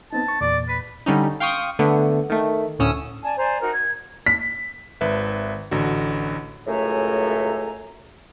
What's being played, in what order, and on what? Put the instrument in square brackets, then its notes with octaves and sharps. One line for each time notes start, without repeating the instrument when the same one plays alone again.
[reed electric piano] B3 C4 D#4 [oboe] A5
[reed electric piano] C#6
[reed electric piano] E2 A#2 [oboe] D5
[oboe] B4
[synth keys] D3 G3 C#4 D#4
F5 G5 C6 C#6 D#6
D3 A3 B3
D#3 A3
D2 A2 C#4 D#6 E6
[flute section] D5 G#5 A5
C5 D5 G#5 A#5
D#4 F#4 A#4
G#6
[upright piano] B6
[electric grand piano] G#1 B4 E5
A1 D3 F#4
[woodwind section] C#2 F#2 A2 A3 G#5 A#5